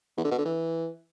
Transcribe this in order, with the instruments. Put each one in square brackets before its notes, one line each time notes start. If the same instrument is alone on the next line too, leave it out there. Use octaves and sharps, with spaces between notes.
[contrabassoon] E2
D3
B2
D3
E3